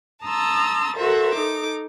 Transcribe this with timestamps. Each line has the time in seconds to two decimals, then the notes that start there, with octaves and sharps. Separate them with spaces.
0.24 A5 A#5 C6 D#6 E6 A6
0.96 F#4 A4 A#4 C5 E5
1.34 D#4 A4 D6